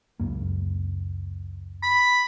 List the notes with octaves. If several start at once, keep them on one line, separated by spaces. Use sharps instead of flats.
C#2 F#2 A#3
B5